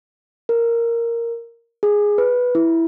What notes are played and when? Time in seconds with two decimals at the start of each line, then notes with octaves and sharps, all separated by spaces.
0.49 A#4
1.83 G#4
2.18 B4
2.55 E4